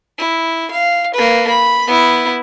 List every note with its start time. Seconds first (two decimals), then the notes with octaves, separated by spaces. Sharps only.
0.18 E4
0.71 F5
1.14 A#3 B4
1.48 B5
1.87 B3 E4